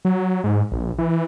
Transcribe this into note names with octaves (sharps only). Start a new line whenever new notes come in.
F#3
G#2
A#1
E3